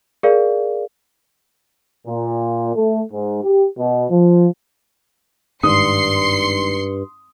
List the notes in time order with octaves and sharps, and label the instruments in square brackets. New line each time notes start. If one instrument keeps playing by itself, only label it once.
[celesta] G#4 A#4 D5 F5
[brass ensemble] A#2
A3
G#2
G4
B2
F3
[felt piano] G#1 [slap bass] G2 [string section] C6 C7 C#7 [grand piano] D#6